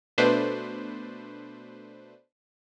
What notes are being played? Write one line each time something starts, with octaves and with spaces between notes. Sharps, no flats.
B2 A3 D4 B4 C5